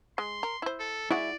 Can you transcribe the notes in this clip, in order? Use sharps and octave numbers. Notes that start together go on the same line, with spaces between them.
G#3 C6
A#4
E4 C5
A4
G#3 E4 F#4 D5